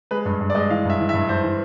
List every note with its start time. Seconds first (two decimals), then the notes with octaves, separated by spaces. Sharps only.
0.11 G#3 B4
0.25 G2
0.41 G2
0.50 D5
0.55 G#3 D#5
0.70 E3 F5
0.85 G2 E5
1.00 E3
1.09 E5
1.14 G2
1.29 G2 C5
1.43 E3